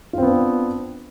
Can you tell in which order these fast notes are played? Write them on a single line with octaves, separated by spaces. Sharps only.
F4 C4 B3 D4